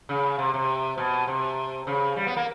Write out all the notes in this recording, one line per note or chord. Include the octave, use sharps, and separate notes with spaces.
C#3
C3
C3
B2
C3
C#3
G3
B3
A#3